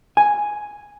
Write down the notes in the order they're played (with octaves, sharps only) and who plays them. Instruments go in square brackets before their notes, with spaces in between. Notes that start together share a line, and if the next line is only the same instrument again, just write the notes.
[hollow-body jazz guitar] G#5